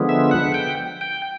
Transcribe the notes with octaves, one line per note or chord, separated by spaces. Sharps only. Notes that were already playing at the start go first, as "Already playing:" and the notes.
Already playing: D3 F3 G#3 B3
E5
F#5
G5
G5